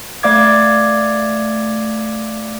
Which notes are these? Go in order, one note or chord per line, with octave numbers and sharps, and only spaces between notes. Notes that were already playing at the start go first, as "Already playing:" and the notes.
A3 D5 F5 D6 G#6